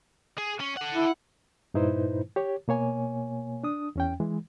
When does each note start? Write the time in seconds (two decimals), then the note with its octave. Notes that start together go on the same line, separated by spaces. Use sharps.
0.38 G#4
0.60 C#4
0.77 A4 F#5
0.94 E4
1.74 G2 A#2 D#4 E4 B4 C5
2.36 G4 C#5
2.68 B2 A#3 C#5 G#5
3.64 D4 D#6
3.96 E2 C#4 G5
4.20 E3 G#3